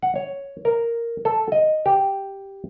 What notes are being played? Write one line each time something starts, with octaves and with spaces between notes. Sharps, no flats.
F#5
C#5
A#4
A4
D#5
G4